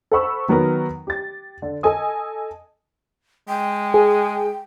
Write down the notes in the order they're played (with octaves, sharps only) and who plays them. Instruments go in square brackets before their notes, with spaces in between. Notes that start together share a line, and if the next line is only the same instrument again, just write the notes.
[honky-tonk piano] A4 C5 F#5 B5 C#6 E6
D#3 F#3 B3 F#4 A#4
G4 A6
D3
A4 D#5 G#5 D#6
[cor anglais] G#3 [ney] G5
[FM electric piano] G#4